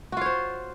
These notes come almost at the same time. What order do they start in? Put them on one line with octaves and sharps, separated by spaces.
F#4 F4 C#5 C5